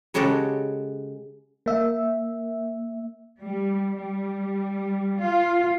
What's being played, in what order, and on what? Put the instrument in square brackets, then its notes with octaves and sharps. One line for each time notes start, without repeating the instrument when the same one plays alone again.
[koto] C#3 G#3 F#4 G4 A4
[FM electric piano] A#3 E5
[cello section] G3
G3
F4